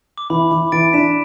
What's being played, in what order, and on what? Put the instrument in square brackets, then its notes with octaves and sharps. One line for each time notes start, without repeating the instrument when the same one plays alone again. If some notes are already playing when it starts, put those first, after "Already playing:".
[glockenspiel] D6
[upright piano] E3 [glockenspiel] B5
[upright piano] E3 [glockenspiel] D6
[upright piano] E3 [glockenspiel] A6 D7
[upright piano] D4 [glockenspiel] B6 E7